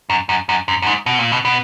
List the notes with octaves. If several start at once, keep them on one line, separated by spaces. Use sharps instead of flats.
F#2
F#2
F#2
F#2
F#2
G#2
B2
A#2
B2
B2